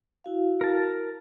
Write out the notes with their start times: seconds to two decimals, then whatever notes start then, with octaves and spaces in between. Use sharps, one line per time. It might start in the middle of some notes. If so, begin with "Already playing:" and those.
0.24 E4 F#4 F5
0.61 A#4 A5